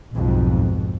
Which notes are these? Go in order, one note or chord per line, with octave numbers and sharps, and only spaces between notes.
B1 F2 G#2